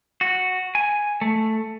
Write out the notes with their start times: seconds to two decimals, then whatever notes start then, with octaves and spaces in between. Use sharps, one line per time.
0.21 F#4
0.75 G#5
1.21 A3